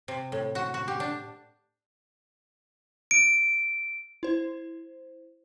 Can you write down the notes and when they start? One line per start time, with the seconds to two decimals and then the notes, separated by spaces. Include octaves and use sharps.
0.08 C3
0.32 A2
0.55 F#4
0.74 F#4
0.88 G4
1.00 D4
3.11 D7
4.23 E4 C5